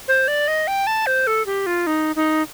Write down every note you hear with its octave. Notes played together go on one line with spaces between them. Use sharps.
C5
D5
D#5
G5
A5
C5
A4
G4
F4
D#4
D#4